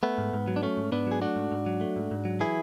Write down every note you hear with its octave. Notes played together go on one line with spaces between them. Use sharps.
A3 B3
G#2
G#2
F#3
D4
A3 C#4
G#2
G#2 B3 D4
F#3 G#4
A3 D4 F#4
G#2
G#2
F#3
A3
G#2
G#2
F#3
E3 E4 G#4